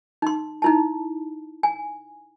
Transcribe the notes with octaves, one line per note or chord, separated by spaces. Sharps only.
D#4 C6
D#4 E4 A5
G#5